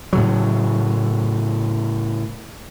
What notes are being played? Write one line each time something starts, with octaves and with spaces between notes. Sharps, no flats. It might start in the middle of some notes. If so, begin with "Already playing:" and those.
A2 C#3 F#3